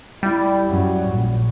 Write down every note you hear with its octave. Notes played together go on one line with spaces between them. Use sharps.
G3 E4
F#2 F#3
A#1